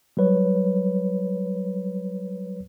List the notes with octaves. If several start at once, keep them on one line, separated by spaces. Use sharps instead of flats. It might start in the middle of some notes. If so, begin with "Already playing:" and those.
F#3 G3 B4 C#5